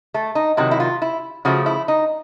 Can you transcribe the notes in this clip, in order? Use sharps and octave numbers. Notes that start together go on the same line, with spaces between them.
A3
D#4
C3 D#3 F#3 E4
E4
F4
E4
C#3 F3 A3 F#4
E4
D#4